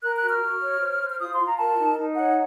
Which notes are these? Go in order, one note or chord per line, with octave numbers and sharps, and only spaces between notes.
A#4 F#6
F#6
F#4
F6
F#4
C#5
C5
C5
F6
F4 D#6
C6
F4
A#5
A#4 A5
D#4
D#4
C#5 F#5